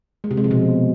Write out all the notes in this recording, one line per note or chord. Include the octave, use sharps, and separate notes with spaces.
G#3
C3
G#3
F3
B2